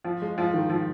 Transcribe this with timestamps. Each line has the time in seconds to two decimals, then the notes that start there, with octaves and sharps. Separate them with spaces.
0.05 F3
0.22 G#3
0.38 F3
0.54 D#3
0.70 F3